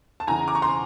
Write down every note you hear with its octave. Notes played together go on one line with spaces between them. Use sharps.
A5
E2 C#3 E3 G#5 A#5
D6
C#6
A#5 C6